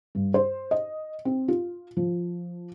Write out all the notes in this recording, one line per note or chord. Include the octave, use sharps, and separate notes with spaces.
G2
C5
D#5
C4
F4
F3